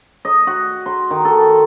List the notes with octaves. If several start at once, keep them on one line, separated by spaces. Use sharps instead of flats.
D#5
F#4
C6
D#3
A4